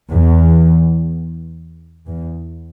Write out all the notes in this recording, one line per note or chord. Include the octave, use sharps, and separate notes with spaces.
E2
E2